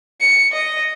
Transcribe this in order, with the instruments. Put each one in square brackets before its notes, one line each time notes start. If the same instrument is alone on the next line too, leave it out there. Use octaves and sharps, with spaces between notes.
[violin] C#7
D#5